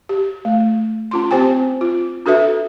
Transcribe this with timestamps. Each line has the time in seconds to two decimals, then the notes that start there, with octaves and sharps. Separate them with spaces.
0.09 G4
0.45 A3
1.11 C#4 F4 C6
1.31 C4 G4 C5 G5 G#5
1.81 F4
2.26 D4 F#4 A4 B4 E5